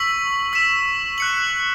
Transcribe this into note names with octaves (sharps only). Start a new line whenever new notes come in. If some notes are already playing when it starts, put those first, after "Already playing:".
Already playing: C#6 E6 B6 F#7
E6 B6 E7
F#6 C#7 F#7